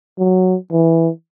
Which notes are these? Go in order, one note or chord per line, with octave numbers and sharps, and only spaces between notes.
F#3
E3